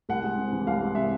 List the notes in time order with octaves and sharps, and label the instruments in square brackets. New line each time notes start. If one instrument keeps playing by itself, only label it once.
[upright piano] C2 F#5
G#3
C3
E3
C2 F5
G#3
C3 E5